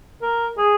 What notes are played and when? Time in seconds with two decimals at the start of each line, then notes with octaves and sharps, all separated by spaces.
0.22 A#4
0.57 G#4